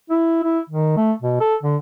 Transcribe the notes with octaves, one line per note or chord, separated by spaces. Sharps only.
E4
E4
D#3
A3
B2
A4
D3